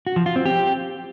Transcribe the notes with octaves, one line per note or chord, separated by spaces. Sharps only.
F#4
F3
F4
C4
G4